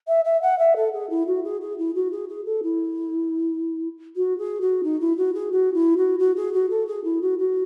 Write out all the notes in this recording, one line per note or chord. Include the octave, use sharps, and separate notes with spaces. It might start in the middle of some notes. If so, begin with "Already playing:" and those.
E5
E5
F#5
E5
A4
G#4
E4
F#4
G#4
G#4
E4
F#4
G#4
G#4
A4
E4
F#4
G#4
F#4
D#4
E4
F#4
G#4
F#4
E4
F#4
F#4
G#4
F#4
A4
G#4
E4
F#4
F#4